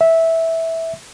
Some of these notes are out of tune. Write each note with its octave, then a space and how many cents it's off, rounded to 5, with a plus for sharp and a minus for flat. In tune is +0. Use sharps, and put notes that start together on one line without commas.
E5 -10